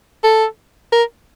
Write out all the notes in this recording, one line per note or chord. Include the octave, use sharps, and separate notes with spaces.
A4
A#4